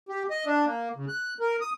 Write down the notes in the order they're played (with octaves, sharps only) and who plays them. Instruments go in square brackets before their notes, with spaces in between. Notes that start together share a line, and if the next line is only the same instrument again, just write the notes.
[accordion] G4
D#5
D4
A#3
C#3
F#6
A#4
D#6